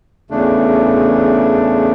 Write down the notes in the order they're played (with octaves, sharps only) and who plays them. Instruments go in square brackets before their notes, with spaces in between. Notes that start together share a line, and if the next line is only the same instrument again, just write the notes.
[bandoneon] E2 C#3 A3 D4